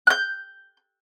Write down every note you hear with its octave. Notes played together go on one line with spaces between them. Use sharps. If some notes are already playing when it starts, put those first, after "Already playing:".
F#6 G6